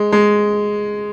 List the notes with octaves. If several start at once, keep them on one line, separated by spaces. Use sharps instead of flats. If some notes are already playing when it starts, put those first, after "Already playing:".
Already playing: G#3
G#3